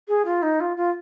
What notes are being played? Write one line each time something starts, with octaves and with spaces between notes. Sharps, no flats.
G#4
F4
D#4
F4
F4